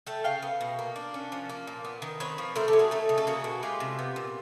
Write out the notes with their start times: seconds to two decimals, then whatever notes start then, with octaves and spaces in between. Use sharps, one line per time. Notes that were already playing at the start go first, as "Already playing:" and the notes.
0.07 A3 G5 A5
0.24 C#3 F5 G5
0.42 B3
0.61 B2
0.79 A#3
0.96 D4
1.14 C#4
1.32 F3
1.49 A#3
1.67 A#2
1.85 B3
2.02 D#3
2.20 C4 B4 C#5
2.38 F3
2.56 A3 A#4 C5
2.68 G4 A4
2.73 C#4
2.79 F#4 G#4
2.91 A3 D#4
3.09 C#3
3.18 A4
3.27 A#3 F#4 G#4
3.44 B2
3.63 G#3 F4 G4
3.80 C3
3.99 B3
4.16 A#2